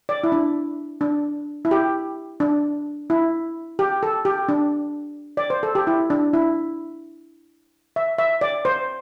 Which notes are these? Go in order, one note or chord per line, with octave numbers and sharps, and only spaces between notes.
D5
E4
D4
D4
E4
G4
D4
E4
G4
A4
G4
D4
D5
C5
A4
G4
E4
D4
E4
E5
E5
D5
C5